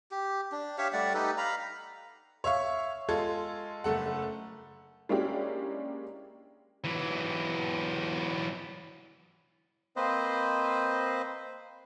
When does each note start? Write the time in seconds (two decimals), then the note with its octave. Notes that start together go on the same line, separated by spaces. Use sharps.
0.11 G4
0.52 D4
0.78 G4 C#5 E5 F5
0.93 G3 A3 D5 F#5
1.14 D#4 G4 A4 B4
1.38 F5 A#5 B5
2.44 C#5 E5 F5 C#6
3.08 G#3 F4 A4 G#6
3.84 F#1 A3 A4 F#5
5.09 G#3 A#3 C#4 D4 E4 G4
6.84 E3 F#3
9.96 A#3 C4 B4 C5 D#5